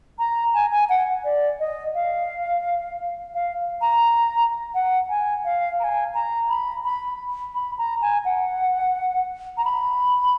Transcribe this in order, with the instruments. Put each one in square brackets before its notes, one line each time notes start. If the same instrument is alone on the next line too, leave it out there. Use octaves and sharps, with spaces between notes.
[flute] A#5
G#5
G#5
F#5
D5
D#5
F5
F5
A#5
F#5
G#5
F5
A#5
G#5
A#5
B5
B5
B5
A#5
G#5
F#5
A#5
B5